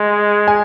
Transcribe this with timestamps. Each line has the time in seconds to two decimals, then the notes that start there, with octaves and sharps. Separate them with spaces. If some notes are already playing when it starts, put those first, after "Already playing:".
Already playing: G#3
0.48 G#5